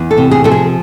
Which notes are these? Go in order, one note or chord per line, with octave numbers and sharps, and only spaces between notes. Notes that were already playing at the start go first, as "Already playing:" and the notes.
Already playing: E2
A4
C3
G#4
F3 A4
G#4